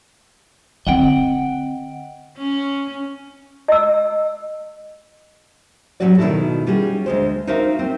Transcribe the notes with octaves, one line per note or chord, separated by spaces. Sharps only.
D3 C4 D#5 F#5 G5
C#4
D#5 E6
A2 F#3 G3 C#4 F#4 D5
B2 D#3 E3 E4 F#4 A4
G3 C#4 F#4 G#4
D2 G#3 C5
D#4 F#4 A#4 C5 E5 F5
C4